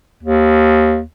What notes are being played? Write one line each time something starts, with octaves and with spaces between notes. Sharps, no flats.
D#2